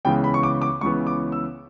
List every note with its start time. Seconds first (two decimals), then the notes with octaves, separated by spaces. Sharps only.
0.05 C#2 C#3 E3 B3 G5
0.24 B5
0.34 C#6
0.43 D6
0.62 D6
0.81 C#2 C#3 E3 B3 C#6
1.07 D6
1.32 E6